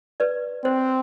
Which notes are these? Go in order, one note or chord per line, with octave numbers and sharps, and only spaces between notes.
B4 D5
C4 C5